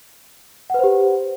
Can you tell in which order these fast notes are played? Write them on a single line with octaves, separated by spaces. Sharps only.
F#5 B4 C5 G4